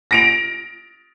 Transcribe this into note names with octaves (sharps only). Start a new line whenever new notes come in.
A#6 D7 F7